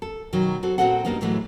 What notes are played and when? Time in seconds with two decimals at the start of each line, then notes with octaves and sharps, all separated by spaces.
0.02 A4
0.33 B2 D#3 F#3
0.63 C4 F#4 A4
0.78 A#2 E3 C4 F#4 A4 F#5
1.05 G2 F#3 G3 A#3 B3 D#4
1.21 A2 E3 F#3 G#3 A3